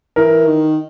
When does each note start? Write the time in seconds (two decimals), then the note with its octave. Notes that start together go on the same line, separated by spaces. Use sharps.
0.16 E3 A#4
0.46 D#3